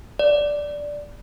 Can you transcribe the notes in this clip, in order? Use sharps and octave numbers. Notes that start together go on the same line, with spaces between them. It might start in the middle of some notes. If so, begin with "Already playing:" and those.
D5